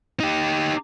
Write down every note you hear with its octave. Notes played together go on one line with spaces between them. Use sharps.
D#4 G4